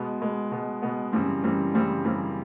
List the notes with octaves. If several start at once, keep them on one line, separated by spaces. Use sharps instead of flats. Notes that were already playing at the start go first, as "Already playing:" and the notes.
Already playing: B2 G#3 B3
B2 G#3 B3
B2 G#3 B3
B2 G#3 B3
F#2 C#3 E3 G3 C4
F#2 C#3 E3 G3 C4
F#2 C#3 E3 G3 C4
F#2 C#3 E3 G3 C4